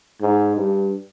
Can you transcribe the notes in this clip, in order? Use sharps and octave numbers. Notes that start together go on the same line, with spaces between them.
G#2
G2